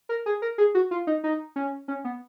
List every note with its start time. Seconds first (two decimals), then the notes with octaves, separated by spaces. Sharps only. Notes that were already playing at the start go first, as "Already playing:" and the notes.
0.09 A#4
0.26 G#4
0.42 A#4
0.58 G#4
0.75 F#4
0.91 F4
1.07 D#4
1.24 D#4
1.56 C#4
1.88 C#4
2.04 B3